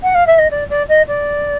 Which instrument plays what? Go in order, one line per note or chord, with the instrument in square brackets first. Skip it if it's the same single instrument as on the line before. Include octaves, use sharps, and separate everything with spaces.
[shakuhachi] F#5
F5
E5
D#5
D5
D5
D#5
D5